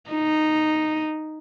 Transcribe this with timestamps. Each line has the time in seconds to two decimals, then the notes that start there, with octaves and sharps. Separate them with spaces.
0.11 D#4